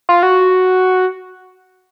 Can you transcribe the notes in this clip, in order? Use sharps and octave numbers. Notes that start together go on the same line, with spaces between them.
F4
F#4